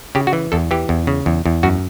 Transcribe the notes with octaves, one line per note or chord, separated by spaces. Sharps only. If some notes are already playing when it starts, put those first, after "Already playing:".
C#3 G4
F#4
E3
E2 A4
E3 G4
E2
C#3
E2
E2
F#2 F#4